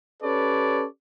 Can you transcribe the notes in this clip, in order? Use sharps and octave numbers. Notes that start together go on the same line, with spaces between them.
C#4 G4 A4 B4 C#5 D5